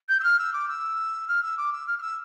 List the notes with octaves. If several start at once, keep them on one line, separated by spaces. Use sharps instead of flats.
G6
E6
F6
E6
D6
E6
F6
E6
D6
E6
F6
F6
E6